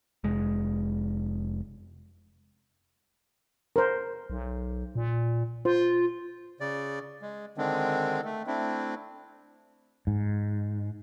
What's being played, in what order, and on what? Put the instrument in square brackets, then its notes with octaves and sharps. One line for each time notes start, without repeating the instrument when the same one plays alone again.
[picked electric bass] F1 G#3
[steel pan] A#4 C5
[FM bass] B1
A#2
[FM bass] F4 [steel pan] C5
[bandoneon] C#3 D5
G#3
D3 D#3 G#3 C4 D4
A3
A3 C4 D4 E4
[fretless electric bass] G#2